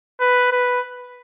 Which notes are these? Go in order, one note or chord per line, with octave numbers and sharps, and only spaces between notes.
B4
B4